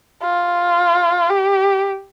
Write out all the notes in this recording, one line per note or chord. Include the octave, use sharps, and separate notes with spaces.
F4
G4